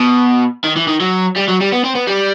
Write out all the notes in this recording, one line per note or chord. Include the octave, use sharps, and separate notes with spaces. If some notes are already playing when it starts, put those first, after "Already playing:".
Already playing: B2
D#3
E3
D#3
F#3
G3
F#3
G3
B3
C4
B3
G3